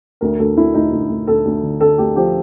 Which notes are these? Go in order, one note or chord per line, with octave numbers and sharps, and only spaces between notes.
D2 A#4
D2 A4
D2 E4
D2 D#4
D2
D2
D2 A4
D2
D3
D3 A4
D2 G4
F3 G4